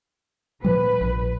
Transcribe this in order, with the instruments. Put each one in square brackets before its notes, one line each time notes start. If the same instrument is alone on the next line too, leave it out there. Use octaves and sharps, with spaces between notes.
[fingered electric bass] A#2 F3 G3 [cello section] B4
[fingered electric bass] A#1 A#2